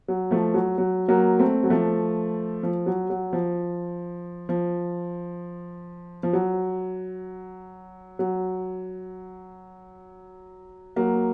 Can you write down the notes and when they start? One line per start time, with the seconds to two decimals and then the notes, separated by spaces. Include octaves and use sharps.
0.08 F#3
0.31 F3 A3
0.54 F#3
0.78 F#3
1.09 F#3 A#3
1.39 A3 C4
1.63 F#3
1.70 F3 A3
2.63 F3
2.86 F#3
3.10 F#3
3.33 F3
4.49 F3
6.23 F3
6.33 F#3
8.19 F#3
10.96 F#3 A#3